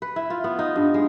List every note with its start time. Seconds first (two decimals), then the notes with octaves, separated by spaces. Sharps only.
0.02 B4
0.16 E4
0.30 F4
0.44 B3
0.59 D#4
0.76 G2
0.94 G#3